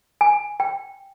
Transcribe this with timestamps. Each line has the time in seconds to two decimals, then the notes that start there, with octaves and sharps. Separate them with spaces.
0.21 G#5
0.60 G5